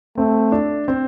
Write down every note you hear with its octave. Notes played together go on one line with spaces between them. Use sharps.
A3 C4
D4
C4